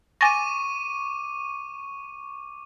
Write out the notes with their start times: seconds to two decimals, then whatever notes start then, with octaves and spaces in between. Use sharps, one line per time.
0.21 G#5 C#6 D6 A6 A#6 D#7